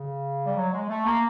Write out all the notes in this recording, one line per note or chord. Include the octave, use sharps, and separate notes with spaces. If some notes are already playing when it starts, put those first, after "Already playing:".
Already playing: C#3
G3
F#3
G#3
A3
A#3